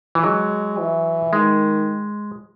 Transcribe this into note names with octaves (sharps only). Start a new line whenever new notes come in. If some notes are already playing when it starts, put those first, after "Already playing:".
E3
F#3 G#3
E3
D#3 G#3